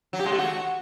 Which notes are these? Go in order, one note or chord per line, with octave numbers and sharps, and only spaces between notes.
F#3
G4
G#3
A3
F#4